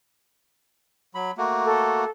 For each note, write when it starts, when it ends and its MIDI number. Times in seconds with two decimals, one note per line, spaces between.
1.15 1.31 54
1.15 1.31 83
1.38 2.05 57
1.38 2.05 58
1.38 2.05 66
1.64 2.09 69